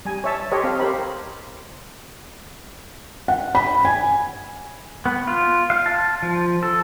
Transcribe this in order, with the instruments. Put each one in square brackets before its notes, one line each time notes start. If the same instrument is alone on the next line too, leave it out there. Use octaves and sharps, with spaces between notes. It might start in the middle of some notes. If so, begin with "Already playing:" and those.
[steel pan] G3 G#5
C#5 E5 A5
G4 A4 C5 C#5 D#5
C4 F5
G4 A#4 C5 B5
[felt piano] F#5
B5
G#5
[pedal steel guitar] B3
F4
F5
A5
F3
A4